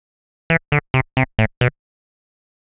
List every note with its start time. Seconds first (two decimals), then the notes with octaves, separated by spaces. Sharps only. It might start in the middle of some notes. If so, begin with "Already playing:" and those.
0.50 E3
0.72 D3
0.94 C3
1.17 C3
1.39 A2
1.61 B2